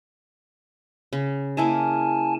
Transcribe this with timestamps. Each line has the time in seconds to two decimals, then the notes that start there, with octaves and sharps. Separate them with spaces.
1.13 C#3
1.57 A#3 E4 G#4 G#5 A5